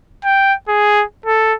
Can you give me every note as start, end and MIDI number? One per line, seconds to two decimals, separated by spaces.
0.25 0.55 79
0.69 1.04 68
1.26 1.54 69